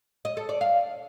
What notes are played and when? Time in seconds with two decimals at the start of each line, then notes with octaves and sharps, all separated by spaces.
0.25 D#5
0.37 A4
0.49 D5
0.61 F5